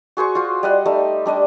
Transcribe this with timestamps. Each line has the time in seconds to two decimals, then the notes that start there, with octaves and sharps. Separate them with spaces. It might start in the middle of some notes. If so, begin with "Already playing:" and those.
0.17 F#4 G#4 C5 C#6
0.35 F4 F#4 C5
0.63 G3 D#5 F#5
0.85 G3 A3 D#4
1.26 G3 D4 D#5